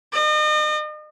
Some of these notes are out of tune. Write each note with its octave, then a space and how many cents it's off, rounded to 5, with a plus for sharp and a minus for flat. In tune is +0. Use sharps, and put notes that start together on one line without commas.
D#5 -40